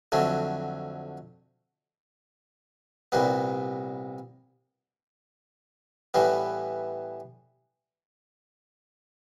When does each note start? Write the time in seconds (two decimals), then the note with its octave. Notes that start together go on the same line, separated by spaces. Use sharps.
0.12 F2 D3 F#3 A3
3.12 C2 A#2 G3 B3
6.14 A2 E3 G3 B3